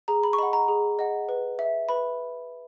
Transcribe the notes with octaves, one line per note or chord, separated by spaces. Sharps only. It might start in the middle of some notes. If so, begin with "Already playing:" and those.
G#4 A#5
B5
C#6
D#5 F#5 B5
A#5
G#4
D#5 F#5
B4
E5
B4 B5